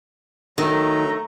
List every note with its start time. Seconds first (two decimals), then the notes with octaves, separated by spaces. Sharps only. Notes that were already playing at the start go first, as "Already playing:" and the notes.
0.58 D#3 F#3 A3 A#5